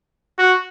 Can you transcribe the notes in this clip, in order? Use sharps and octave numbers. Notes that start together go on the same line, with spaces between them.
F#4